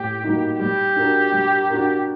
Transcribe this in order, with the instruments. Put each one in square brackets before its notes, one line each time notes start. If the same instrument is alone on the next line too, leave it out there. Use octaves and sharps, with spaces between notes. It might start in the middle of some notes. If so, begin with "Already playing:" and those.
Already playing: [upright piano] A2 G3 A#3 [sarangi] G4
[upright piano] G3 A#3 D#4 F#4
[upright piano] G3 [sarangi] G4
[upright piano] D4 F#4 A#4
G3
D4 F#4 A#4